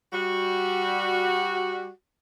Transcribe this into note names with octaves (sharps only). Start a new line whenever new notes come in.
G3 F#4